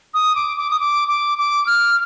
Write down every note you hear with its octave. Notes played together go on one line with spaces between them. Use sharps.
D#6
D6
D6
D#6
D6
D6
D6
F6